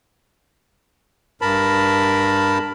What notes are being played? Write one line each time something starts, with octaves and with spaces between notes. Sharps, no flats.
G2 A#4 A5 B5